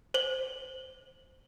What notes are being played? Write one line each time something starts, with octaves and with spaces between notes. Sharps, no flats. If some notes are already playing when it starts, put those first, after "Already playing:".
C5 F#7